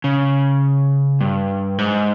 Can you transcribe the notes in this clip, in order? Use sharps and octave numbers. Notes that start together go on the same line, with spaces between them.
C#3
G2
G#2